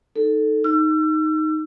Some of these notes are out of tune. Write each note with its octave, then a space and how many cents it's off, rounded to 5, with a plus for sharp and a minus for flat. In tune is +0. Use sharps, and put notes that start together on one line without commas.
D#4 +0 A4 +0
D#4 +0 E6 +35